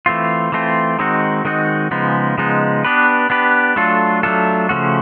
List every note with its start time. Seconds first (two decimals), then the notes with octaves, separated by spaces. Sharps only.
0.06 E3 A3 C4 F4
0.52 E3 A3 C4 F4
0.99 D#3 G#3 C4 D#4 F#4
1.45 D#3 G#3 C4 D#4 F#4
1.91 C#3 F3 G#3 B3 D#4
2.38 C#3 F3 G#3 B3 D#4
2.85 B3 D4 G4 B4
3.30 B3 D4 G4 B4
3.76 F#3 A3 D4 F4 A4
4.23 F#3 A3 D4 F4 A4
4.69 C#3 F3 A3 C#4 F#4